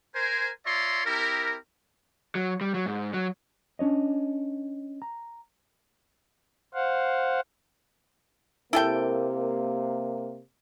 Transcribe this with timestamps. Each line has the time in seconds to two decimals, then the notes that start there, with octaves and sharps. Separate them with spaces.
0.15 A#4 C5 G#5
0.66 F4 C#5 D5 E5 A#5 C6
1.06 C4 E4 G4 A#4
2.35 F#3
2.61 G3
2.74 F#3
2.86 G#2
3.14 F#3
3.79 C#4 D4 C#5 D#5
5.02 A#5
6.74 C5 F5 F#5
8.73 C3 A#3 E4 A4 G5